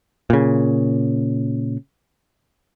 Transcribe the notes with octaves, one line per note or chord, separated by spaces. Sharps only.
A#2 C#3